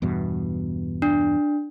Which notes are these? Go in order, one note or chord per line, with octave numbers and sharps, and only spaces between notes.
E2 G2 B2
D4